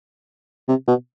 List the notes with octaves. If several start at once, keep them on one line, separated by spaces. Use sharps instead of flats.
C3
B2